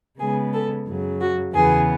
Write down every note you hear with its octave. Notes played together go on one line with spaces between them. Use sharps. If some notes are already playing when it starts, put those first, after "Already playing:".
C#3 G#3 B3 G#4
A4
F#2 C#3 F#3
F#4
E2 C#3 E3 B3 G#4